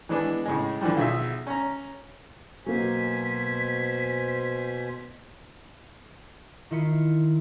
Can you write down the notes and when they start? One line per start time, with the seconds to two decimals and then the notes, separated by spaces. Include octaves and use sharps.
0.09 E3 G#3 B3 D4
0.45 A2 C#3 G#3
0.81 D3 E3 F3 G3
0.97 B1 F4 G#4 E5
1.47 C#4 A#5
2.66 B2 F#3 A#3 C5 G#5 B6
6.71 D#3 E4 F4 B6 C#7 D#7